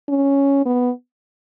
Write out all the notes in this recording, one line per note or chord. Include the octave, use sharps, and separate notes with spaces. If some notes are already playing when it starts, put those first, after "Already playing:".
C#4
B3